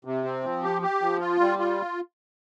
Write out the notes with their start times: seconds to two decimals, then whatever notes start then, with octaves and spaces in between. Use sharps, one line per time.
0.05 C3
0.24 C4
0.44 F3
0.63 G4
0.82 G4
1.01 F3
1.20 F4
1.40 G3
1.59 F4